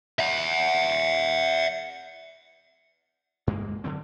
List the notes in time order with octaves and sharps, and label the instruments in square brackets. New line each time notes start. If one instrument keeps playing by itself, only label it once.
[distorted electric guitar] E5 F#5
[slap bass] G2 G#3 A#3
D3 F#3 C4